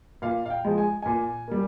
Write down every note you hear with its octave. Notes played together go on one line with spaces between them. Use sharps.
A#2 F5
F5
G5
F3 G#3
G#5
A#2 G#5
G3 A#3